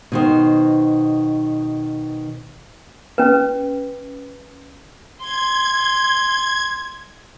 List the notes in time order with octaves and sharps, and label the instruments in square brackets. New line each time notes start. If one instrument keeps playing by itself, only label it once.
[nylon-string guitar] B2 D#3 C5
[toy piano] C#4 B4
[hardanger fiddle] C6 [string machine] G#6